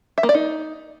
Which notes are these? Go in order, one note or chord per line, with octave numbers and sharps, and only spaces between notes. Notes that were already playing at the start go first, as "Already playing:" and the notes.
E5
A#3
D5
D#4